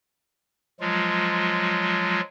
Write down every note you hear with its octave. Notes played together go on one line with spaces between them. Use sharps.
F3 F#3 G#3 F4